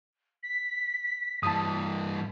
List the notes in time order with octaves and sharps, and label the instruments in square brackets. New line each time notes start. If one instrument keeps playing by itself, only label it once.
[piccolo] B6
[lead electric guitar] G2 E3 [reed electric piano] A5 D#6